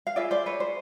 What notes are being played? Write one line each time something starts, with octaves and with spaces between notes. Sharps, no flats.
F5
F4 G#4 B4 D5 E5
C5 D5
B4 C#5
C5